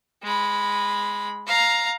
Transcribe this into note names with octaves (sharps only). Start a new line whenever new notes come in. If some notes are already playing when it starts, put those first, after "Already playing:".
G#3 B5
F5 A#5